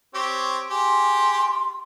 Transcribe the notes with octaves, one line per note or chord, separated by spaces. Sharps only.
C4 G4 C#5
G4 G#4 C6